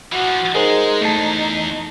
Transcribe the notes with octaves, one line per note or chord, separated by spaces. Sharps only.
E3 F3 F#4
G#3 D#4 G#4 A#4 C5
E2 A3 A5